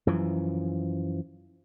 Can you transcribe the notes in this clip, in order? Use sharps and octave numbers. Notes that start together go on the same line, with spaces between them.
F#2 E3 F3